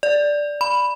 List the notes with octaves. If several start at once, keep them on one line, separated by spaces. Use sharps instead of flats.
D5
B5